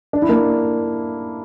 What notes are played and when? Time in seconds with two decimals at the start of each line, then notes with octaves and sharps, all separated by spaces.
0.13 D4
0.22 E4
0.29 A#3 D4